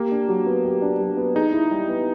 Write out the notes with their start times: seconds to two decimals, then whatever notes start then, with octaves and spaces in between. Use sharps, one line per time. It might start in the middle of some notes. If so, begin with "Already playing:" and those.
Already playing: A#3 G4
0.11 D4
0.28 F#3
0.46 B3
0.64 G4
0.82 D4
1.00 F#3
1.17 B3
1.35 D#4 G#4
1.52 E4
1.71 G3
1.89 B3